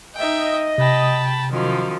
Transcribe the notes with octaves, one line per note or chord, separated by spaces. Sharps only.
D#4 D#5 E5 G5
C3 G5 A5 B5
F#2 D#3 F3